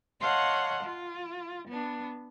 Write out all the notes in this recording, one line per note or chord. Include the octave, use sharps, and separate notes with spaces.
C#5 D#5 F5 F#5 A5 C6
F4
B3 D4